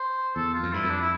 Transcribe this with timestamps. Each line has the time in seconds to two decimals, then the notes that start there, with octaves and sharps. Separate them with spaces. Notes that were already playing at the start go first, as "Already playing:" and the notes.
Already playing: C5
0.36 E2 A4
0.54 F4
0.63 F2
0.73 G2 E4
0.84 F2
0.90 D4
1.01 E4